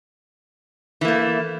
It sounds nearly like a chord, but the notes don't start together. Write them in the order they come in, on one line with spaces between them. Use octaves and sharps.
E3 A#3 A3